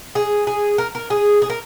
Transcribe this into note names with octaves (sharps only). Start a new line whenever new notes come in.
G#4
G#4
A#4
A#4
G#4
G#4
A#4